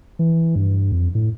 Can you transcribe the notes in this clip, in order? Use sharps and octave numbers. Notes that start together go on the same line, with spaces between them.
E3
G2
F2
A2